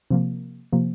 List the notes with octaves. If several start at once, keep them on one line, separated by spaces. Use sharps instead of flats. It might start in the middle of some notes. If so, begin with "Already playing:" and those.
C3 F3 A#3
C3 F3 A#3